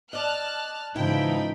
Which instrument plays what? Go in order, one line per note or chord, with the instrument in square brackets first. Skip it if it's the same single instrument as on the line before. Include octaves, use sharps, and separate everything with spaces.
[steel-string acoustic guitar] D5 D#5 [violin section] A5 F6 F#6
[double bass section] G#2 C#3 E3 [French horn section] F3 D#4 [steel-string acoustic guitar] E4 [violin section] G5 B5